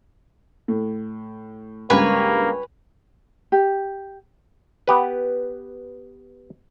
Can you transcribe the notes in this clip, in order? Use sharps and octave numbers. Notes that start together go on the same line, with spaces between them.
A2
C#2 G2 A#3 B4 C#5 G#5
G4
B3 G4 B4